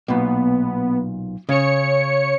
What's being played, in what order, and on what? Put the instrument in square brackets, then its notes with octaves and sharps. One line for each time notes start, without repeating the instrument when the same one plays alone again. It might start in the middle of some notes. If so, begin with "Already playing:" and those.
[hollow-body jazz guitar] B1 A#2 [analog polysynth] B3
[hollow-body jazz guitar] C#3 [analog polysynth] C#5 C#7